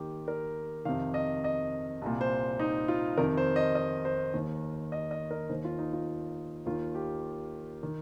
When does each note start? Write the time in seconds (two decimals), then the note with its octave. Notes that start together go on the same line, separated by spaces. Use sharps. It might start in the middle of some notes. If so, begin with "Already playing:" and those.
Already playing: D#2 D#3 G4
0.28 A#4
0.85 F2 C3 D#3 F5
1.14 D#5
1.44 D#5
2.02 C2 A#2
2.21 C5
2.60 D#4
2.88 F4
3.17 F2 C3 D#3 A#4
3.37 C5
3.56 D#5
3.75 D#5
4.05 C5
4.34 D#2 D#3
4.92 D#5
5.11 D#5
5.31 A#4
5.50 D#2 D#3 C5
5.65 F4
5.78 D#4
5.93 F4
6.66 D#2 D#3 F4
6.95 G4
7.83 D#3